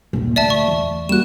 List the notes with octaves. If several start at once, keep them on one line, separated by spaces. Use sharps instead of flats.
D#1 A#1
D2 D5 E5 A5
C#6
E2
G3 A#3 F#4 F#6 E7